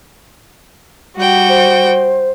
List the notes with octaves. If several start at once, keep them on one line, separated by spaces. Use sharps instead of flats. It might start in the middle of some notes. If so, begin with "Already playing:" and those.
G3 F#4 G5
C5